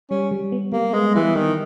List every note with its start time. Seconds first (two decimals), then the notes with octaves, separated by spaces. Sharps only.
0.11 G3 C#4
0.31 G3
0.52 B3
0.72 G3 A#3
0.94 G#3 B3
1.15 E3 G3
1.36 D#3 G3